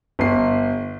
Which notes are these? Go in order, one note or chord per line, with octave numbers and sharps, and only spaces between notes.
G1 C7